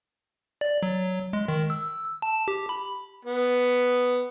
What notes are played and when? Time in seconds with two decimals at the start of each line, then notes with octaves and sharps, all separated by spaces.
0.61 D5
0.83 F#3
1.33 G#3
1.48 D#3
1.70 E6
2.22 A5
2.48 G4
2.69 B5
3.25 B3